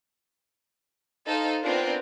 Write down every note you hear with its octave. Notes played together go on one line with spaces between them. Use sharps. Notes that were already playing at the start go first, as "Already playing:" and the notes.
D#4 A4 C5 F5
B3 C4 D4 F4 A#4